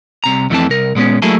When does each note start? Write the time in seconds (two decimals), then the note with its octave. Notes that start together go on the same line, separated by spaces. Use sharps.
0.24 C2 C3 A#5
0.50 F2 D#3 E3 A3 C4 A5
0.69 C2 A#4
0.95 A#2 G#3 B3 C#4
1.22 F#3 A3 A#3 E4 G#4 A4